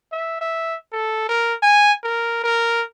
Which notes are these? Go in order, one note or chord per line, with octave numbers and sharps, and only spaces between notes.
E5
E5
A4
A#4
G#5
A#4
A#4